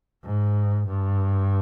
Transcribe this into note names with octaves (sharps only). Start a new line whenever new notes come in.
G#2
G2